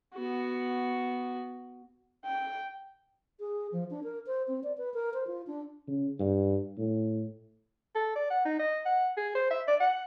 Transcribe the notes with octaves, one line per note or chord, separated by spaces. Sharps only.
B3 F#4
G5
G#4
F3
D4
A#4
C5
C4
D5
B4
A#4
C5
F4
D4
C#3
G2
A2
A4
D5
F#5
D#4
D#5
F#5
G#4
C5
E5
D5
F#5